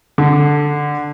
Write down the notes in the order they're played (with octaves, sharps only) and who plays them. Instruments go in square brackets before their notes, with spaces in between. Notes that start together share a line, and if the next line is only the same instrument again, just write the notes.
[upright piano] D3